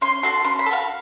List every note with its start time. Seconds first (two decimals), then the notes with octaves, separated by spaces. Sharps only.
0.01 C#4 C6
0.23 F#4 A4 C6
0.44 C#4 C6
0.59 B5
0.66 A4
0.71 F#4 F5